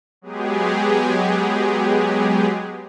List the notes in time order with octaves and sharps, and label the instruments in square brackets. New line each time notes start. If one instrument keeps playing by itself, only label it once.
[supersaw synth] F#3 G#3 B3 G4 G#4